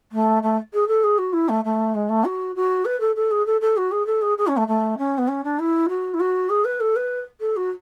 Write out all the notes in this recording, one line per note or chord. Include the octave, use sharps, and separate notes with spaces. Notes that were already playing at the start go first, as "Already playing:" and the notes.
A3
A3
G#4
A4
G#4
F#4
E4
A3
A3
G#3
A3
F#4
F#4
B4
A4
A4
G#4
A4
A4
F#4
G#4
A4
G#4
G#4
C#4
A3
A3
C#4
B3
C#4
D4
E4
F#4
E4
F#4
G#4
B4
A4
B4
A4
F#4